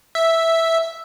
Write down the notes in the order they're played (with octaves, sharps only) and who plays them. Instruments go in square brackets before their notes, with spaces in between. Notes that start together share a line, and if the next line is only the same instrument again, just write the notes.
[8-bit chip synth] E5